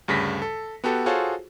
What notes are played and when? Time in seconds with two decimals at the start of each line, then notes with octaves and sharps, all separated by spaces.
0.08 D2 G2 C#3 A#6 B6
0.42 A4
0.84 B3 F#4 G4 A4
1.06 F4 F#4 G#4 A4 C5 C#5